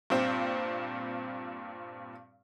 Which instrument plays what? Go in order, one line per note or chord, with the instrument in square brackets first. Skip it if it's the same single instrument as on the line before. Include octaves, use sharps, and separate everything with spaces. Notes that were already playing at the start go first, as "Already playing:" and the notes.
[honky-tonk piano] G2 A#2 C4